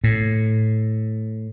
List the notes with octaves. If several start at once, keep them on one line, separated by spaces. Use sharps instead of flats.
A2